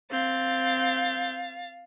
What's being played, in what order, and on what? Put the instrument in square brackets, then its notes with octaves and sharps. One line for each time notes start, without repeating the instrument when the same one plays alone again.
[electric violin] C4 G6 [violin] F5 A6